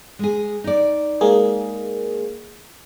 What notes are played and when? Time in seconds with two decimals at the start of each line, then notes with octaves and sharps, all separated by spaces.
0.19 G#3 G#4
0.64 D#4 D5
1.21 G#3 A#3 G#4